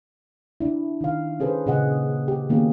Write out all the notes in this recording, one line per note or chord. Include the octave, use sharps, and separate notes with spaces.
D4 E4
D#3 D#4 F5
C#4 G#4 A4 B4 C5
A#2 C#3 G#4 D#5 F#5
G4
D#3 A#3 B3 C#4 F#4 G#4